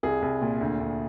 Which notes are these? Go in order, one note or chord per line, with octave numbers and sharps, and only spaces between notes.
C2 G#4
C2
A#2
D2
D2